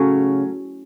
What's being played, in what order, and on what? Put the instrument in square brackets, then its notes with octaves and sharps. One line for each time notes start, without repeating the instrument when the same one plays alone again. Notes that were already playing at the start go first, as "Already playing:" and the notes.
Already playing: [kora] A2 C#3 F#3 C#4 A4